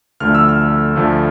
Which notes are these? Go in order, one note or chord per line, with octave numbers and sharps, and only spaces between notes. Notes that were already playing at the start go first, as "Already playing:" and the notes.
D2 D3 F3 A3 F6
E6
F6
D2 D3 F3 A3